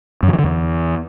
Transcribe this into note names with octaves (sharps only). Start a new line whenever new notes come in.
F#2
D#3
E3
D3
E2